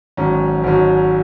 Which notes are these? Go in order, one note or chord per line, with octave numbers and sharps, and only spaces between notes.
G#1 G#2 F#3 C#4
G#1 G#2 F#3 C#4